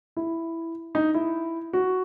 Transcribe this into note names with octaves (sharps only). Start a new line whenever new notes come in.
E4
D#4
E4
F#4